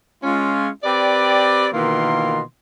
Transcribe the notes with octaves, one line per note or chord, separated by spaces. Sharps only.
G#3 C#4 F4
C4 G4 B4 D5
B2 D#3 E3 A#3 F4 C6